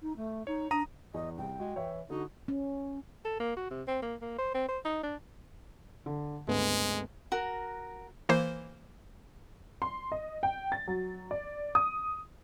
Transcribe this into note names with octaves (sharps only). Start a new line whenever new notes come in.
D#4
A3
D#4 C#5
D4 A#5 D#6 D#7
E2 D#5
C2 G5
G#3 F#4
E3 C#5 E5
D3 D#4 F#4
C#4
A4
A#3
F#4
C3
C4
A#3
A#3
C5
C4
C5
D#4
D4
D3
G#1 D2 G#3 B3
F#4 A#4
E3 A#3 C5
C6
D#5
G5
A6
F#3
D5
D#6